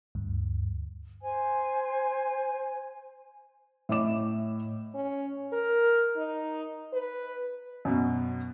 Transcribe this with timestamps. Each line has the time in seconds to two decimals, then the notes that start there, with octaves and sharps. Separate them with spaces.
0.15 D2 G2
1.22 C5 G#5
3.89 A2 C#5 D#5 E5 D6 E7
4.94 C#4
5.53 A#4
6.17 D#4
6.93 B4
7.85 F#2 B2